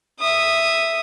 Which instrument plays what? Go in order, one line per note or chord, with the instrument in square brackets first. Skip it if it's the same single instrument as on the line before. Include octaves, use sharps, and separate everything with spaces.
[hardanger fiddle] E5 D#6